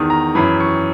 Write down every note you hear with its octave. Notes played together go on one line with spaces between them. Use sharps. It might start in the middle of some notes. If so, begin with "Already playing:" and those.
Already playing: E2 D#3 D#6
A#5
F#2 E3 B5
C#6